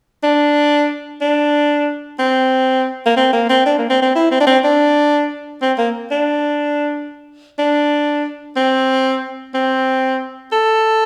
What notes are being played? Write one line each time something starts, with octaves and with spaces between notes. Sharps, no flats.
D4
D4
C4
A#3
C4
A#3
C4
D4
A#3
C4
C4
E4
C4
D4
C4
D4
C4
A#3
D4
D4
C4
C4
A4